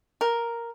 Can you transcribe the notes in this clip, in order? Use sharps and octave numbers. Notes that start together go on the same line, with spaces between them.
A#4